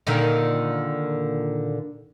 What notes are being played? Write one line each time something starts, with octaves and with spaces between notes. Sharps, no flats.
A#2 D3 D#3